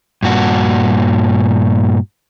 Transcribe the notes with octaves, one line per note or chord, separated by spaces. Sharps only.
G2 A#2 F#4